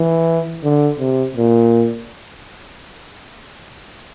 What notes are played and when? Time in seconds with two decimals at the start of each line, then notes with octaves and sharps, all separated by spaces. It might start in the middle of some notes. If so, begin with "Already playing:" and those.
Already playing: E3
0.63 D3
1.00 C3
1.36 A#2